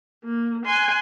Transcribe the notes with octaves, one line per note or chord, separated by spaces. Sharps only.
A#3
G#5 C6 F#6